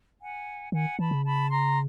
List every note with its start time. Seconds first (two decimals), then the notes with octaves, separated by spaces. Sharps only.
0.21 F#5 G#5
0.72 D#3 F#5 G#5
0.98 E3 A5 B5
1.11 C#3
1.24 A5 B5
1.51 A#5 C6